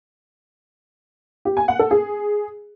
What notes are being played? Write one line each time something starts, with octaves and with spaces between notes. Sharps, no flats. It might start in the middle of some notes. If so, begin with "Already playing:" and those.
G4
G#5
F#5
A4
G#4